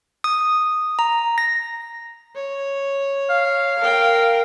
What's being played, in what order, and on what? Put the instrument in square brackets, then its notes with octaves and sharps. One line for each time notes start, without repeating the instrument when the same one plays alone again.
[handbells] D#6
A#5
A#6
[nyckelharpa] C#5
[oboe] F5
[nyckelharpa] A#4 G5